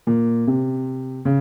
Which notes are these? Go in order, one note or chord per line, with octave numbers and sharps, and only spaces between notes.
A#2
C3
C#3